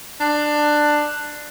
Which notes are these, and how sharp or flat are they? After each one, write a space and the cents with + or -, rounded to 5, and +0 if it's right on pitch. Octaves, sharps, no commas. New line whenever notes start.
D4 +15